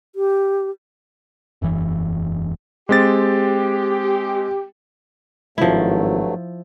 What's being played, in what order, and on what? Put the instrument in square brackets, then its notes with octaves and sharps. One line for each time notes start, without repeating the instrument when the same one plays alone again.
[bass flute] G4
[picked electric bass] E1 F#2 E3
[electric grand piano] G#3 C4 A6 [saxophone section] G4
[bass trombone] G#1 [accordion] G2 F#3 A3 [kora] F3 E4